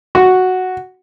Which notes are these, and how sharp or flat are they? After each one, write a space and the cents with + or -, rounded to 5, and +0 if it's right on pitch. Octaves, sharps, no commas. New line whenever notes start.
F#4 +0